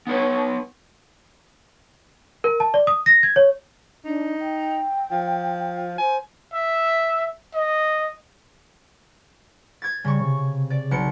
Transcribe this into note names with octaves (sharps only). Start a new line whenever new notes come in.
B3 D#4 B4 C#5
A#4
A5
D5
D#6
A#6
G#6
C#5
D4 D#4
G5
F3
C5 G#5
E5
D#5
G#6 A6
C#3 G3 C#6
C3
D5
B1 C#7